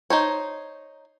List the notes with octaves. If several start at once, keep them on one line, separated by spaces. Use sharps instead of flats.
D#4 C5 C#5